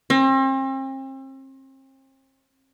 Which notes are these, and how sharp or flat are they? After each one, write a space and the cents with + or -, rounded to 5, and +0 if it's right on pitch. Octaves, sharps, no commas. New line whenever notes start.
C4 +40